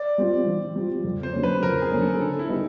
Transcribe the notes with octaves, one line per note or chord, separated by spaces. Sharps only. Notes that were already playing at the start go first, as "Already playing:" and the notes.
Already playing: D5
G3 C4 F4
E3
G3 C4 F4
F2
C5
D3 F#3 A#3 C#4
B4
F2 A#4
G#4
D3 F#3 A#3 C#4
A4
D3 A4
E4
G3 B3 D#4